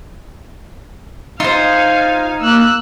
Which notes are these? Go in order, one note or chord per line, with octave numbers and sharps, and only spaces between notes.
D#4 F4 C5 F5 G#5
A#3 E6 F#6